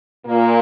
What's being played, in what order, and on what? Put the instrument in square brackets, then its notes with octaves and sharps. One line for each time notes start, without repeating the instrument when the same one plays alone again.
[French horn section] A#2 A#3